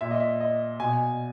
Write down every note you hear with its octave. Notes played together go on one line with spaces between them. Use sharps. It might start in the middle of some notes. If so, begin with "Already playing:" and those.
A#2 E5
D#5
E5
D#5
B2 G#5